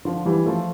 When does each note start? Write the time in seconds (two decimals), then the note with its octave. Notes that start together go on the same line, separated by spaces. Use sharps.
0.05 D3 F3
0.25 E3 G3
0.46 F3 A3